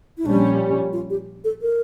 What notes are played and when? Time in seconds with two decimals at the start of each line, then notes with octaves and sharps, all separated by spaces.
0.18 E4
0.24 A#1 A#2 G3 C#4 D4
0.93 F4
1.10 G4
1.44 A4
1.62 A#4